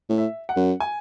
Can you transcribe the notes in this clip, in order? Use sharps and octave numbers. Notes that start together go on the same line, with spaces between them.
A2
E5
F#5
F#2
G#5